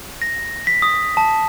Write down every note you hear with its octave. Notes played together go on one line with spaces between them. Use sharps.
A#6
B6
D#6
A5